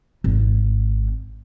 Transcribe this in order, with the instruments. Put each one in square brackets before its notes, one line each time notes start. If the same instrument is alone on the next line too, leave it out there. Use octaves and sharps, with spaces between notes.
[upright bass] G#1